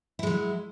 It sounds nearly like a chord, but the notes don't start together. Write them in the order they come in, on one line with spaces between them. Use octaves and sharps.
E4 G#3 F#3